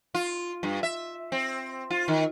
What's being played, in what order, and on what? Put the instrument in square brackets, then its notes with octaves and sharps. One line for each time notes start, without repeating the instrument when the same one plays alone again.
[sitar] F4
G2
E5
C4
F4
D#3